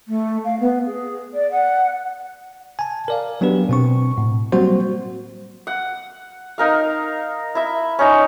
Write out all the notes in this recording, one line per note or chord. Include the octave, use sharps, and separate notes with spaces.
A3
F5
B3
G#4
D5
F#5
G#5 A5
A#4 D5 F5
F#3 B3 D4 G4 B4
B2 C4 C#6
A2
F#3 G3 A#3 C4 F#4 C5
F#5
D#4 A#4 F5
E4 E5
C#4 D#4 C#5